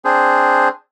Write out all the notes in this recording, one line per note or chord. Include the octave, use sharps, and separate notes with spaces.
C4 D4 G#4 C5